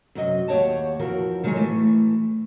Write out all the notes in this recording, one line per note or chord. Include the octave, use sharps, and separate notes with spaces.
F#2 C3 F#3 F#4 D#5
D#2 G4 C#5 F#5 A5
F2 E3 F3 F#4 A#4
D#3 F#3 G#3 E4 G#4 C#5
A2 E3 A3